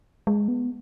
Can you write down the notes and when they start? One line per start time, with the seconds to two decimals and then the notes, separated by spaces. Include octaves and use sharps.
0.27 G#3
0.48 B3